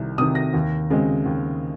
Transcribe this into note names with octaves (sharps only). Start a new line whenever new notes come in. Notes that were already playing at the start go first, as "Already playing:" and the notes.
Already playing: C2 C3 D#3
C3 D#3 D#6
A#6
D#2
C#3 G#3 C4
D#2